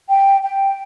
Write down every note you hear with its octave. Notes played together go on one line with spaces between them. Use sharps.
G5
G5